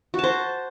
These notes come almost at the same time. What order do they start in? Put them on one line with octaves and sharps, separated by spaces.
F#4 A5 C5